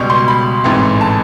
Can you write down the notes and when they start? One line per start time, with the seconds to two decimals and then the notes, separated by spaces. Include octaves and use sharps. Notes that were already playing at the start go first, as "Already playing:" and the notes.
Already playing: C#2 B2 G3 C#6
0.10 C6
0.28 B5
0.64 A1 G#2 E3 A3 C4
1.01 A5